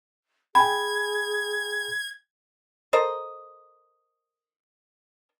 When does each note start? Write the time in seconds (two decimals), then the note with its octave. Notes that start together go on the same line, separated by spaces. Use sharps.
0.55 G#4 G5 G#5 B5 G#6
2.93 A4 A#4 C5 D#5